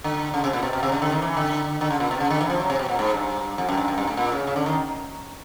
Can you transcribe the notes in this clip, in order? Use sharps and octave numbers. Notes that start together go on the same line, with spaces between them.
D3
C#3
C3
A#2
B2
B2
C3
C#3
D3
D#3
E3
D3
D3
C#3
A#2
B2
C#3
D3
E3
F3
F#3
C3
B2
A#2
G#2
G2
F2
F#2
G2
F#2
G2
A2
A#2
C#3
C#3
D3
D#3